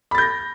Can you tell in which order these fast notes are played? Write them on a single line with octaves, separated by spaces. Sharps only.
B5 A6 G6 A#6